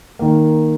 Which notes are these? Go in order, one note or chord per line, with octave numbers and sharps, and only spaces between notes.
D#3 A#3